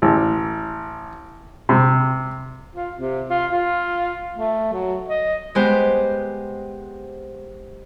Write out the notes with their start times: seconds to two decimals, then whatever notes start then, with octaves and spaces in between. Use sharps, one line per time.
0.02 A1
1.69 C3
2.75 F4
2.96 C3
3.29 F4
3.52 F4
4.36 A3
4.72 F#3
5.08 D#5
5.55 G#3 B3 G4 C5